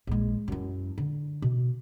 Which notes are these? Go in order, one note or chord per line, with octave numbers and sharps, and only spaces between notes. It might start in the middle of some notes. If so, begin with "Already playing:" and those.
A#1 G#3
F#2 E4
D3
B2